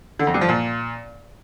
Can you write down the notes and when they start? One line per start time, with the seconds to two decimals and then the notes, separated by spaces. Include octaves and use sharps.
0.19 D3
0.27 F2
0.34 G2
0.41 F3
0.49 A#2